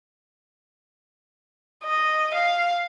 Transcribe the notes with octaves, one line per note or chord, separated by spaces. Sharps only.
D#5
F5